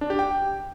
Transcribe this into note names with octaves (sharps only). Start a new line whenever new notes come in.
D4
G4
G5